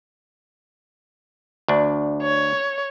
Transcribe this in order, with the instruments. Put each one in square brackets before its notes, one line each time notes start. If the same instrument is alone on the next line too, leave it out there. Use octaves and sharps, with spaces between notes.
[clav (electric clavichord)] D2 D4
[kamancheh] C#5